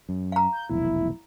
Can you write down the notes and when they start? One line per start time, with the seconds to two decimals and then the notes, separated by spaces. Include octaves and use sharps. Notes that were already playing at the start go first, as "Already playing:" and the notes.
0.09 F#2
0.32 F5 A#5
0.52 G6
0.69 F1 B1 E2 E4